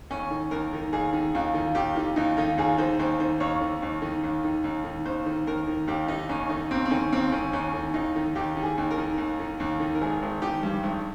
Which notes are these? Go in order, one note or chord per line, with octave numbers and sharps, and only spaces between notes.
D#2 C#4
D#3
D#2 A#4
D#3
D#2 G#4
D#3
D#2 F4
D#3
D#2 G4
D#3 F4
D#2 D#4
D#3 F4
D#2 G#4
D#3 C5
D#2 C5
D#3 C5
D#2 C#5
D#3
D#2
D#3
D#2
D#3
D#2
D#3
D#2 C5
D#3
D#2 A#4
D#3
D#2 G4
D#3 D#4
D#2 C#4
D#3 D#4
D#2 C4
C4
D#3 C#4
D#2 C4
D#3 C#4
D#2 C#4
D#3
D#2 D#4
D#3
D#2 G4
D#3
G#4
D#2
A#4
D#3
D#2
D#3
D#2
D#3
A#4
G#1 G#4
G#1
D#3 G4
G2
G#1